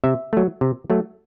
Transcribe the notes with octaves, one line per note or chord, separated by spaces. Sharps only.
C3 E5
F#3 A3
C3
F#3 A3